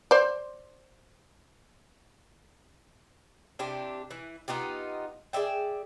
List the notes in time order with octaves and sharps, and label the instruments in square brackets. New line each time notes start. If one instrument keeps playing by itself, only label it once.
[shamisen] C5 D5
[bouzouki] C3 D4 E4 G4
E3
B3 D#4 F4 G4
G#4 D5 E5 G5